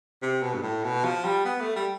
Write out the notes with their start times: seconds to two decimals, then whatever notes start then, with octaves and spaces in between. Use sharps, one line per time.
0.22 C3
0.43 B2
0.54 G2
0.63 A2
0.84 B2
1.05 F3
1.25 G3
1.45 B3
1.60 A3
1.76 G3